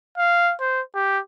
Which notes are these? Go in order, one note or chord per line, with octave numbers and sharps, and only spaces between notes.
F5
C5
G4